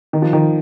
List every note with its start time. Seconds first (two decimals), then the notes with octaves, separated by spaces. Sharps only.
0.13 D#3
0.22 F3
0.33 D#3